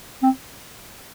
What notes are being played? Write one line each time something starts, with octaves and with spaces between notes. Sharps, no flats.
C4